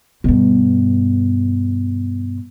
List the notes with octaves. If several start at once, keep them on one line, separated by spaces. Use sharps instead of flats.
G2 B2